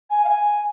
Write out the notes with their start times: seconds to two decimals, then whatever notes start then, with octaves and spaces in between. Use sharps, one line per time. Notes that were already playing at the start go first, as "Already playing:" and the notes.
0.10 G#5
0.24 F5
0.28 G#5